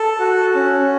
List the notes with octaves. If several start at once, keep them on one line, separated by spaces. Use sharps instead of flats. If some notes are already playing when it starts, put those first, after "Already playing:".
Already playing: A4
F#4
C#4